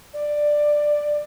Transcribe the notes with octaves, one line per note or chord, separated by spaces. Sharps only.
D5